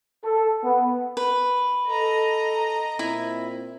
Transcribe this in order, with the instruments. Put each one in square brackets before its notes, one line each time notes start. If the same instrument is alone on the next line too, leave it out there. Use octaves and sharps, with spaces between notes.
[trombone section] A4
B3
[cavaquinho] B4
[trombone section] A4 [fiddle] D#5 A#5
[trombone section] A#2 C4 [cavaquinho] E4